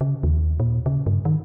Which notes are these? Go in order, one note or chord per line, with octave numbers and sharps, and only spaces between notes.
C#3
D#2
A#2
C#3
G2
D#3